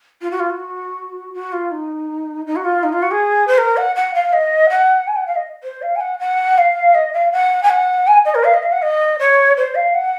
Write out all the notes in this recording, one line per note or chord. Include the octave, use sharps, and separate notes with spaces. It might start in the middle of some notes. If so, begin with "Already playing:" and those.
F4
F#4
F4
F#4
F#4
F4
D#4
D#4
F#4
F4
D#4
F4
F#4
G#4
C5
A#4
F#5
F#5
F5
D#5
F#5
G#5
F#5
F5
D#5
C5
F5
G#5
F#5
F#5
F5
D#5
F5
F#5
G#5
F#5
G#5
D#5
A#4
F5
D#5
F5
F#5
D#5
C#5
C5
F5
F#5